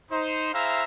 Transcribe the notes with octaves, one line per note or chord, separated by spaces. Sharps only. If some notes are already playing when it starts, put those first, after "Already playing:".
D#4 C5
E4 G#4 C5 E5 F5 A#5